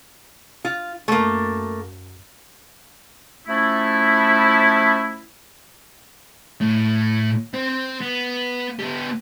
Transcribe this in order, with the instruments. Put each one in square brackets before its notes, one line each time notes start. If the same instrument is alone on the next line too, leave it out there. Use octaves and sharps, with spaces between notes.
[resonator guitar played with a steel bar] F4
[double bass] F#2 [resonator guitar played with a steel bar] A3 A#3
[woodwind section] F3 A3 C#4 E4
[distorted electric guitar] A2
C4 C5
B3
B3 G4